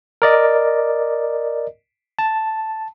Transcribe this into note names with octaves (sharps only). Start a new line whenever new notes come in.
A#4 D5 D#5
A5